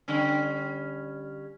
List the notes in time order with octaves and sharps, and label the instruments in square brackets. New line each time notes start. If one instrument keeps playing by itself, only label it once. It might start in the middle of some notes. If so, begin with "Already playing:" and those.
[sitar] D3 G3 C#4